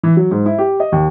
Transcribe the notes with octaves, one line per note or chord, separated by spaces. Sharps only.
E3
F#3
G#2
E4
G4
D#5
D#2